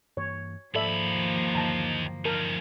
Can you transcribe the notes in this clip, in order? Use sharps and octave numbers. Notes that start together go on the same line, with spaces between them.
G2 E3 A#3 C#5
D#2 G#2 F3 A#3 A4 D5 E5 B5
G2 D3 E3 A5 A#5
F3 D#4 A#4 A5